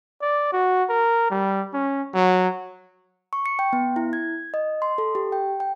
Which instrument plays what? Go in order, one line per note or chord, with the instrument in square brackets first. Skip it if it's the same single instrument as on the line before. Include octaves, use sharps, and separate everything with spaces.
[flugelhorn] D5
F#4
A#4
G3
C#4
F#3
[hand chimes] C#6
C#7
G5
B3
E4
G#6
D#5
C6
A4
G4
G5
G5